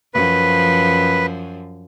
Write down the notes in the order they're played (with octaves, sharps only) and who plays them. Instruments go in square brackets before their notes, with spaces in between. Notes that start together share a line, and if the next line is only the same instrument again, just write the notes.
[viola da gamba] F#2 F3 [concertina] B4